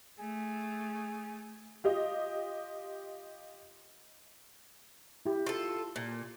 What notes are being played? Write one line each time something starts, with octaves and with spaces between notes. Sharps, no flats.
A3 G#4
F4 G4 D#5
E4 G4
F4 A4
A#2